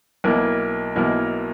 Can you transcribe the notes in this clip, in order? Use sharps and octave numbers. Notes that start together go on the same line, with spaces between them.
B1 B2 A#3 E4 A#4
B1 B2 A#3 E4 A#4